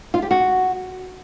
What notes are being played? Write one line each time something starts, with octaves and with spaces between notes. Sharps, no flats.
F4
G4
F#4